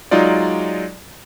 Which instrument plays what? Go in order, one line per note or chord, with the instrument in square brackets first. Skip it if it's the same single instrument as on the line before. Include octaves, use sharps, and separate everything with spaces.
[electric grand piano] F#3 G#3 D#4 F4 D5